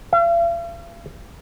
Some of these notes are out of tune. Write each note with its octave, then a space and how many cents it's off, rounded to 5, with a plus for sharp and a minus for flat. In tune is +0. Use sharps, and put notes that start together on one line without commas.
F5 -45